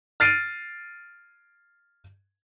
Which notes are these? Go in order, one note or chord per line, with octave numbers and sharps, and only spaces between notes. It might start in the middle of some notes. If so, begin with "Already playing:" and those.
F6 A6 C7 D7 D#7